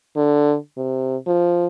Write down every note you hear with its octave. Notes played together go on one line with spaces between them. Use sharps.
D3
C3
F3